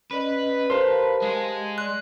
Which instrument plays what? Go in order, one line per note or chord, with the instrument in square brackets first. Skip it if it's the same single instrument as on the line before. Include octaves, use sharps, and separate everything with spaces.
[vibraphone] C#4 D5 D#5 [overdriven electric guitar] B4
[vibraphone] G4 F5 A5 [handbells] A#4 [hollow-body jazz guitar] C5 C6
[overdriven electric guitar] G#3 G#4
[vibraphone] D5 D#5 C6 [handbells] F#6